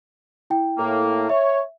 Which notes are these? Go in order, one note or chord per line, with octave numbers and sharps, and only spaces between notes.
E4 G5
A2 A#3
C#5 E5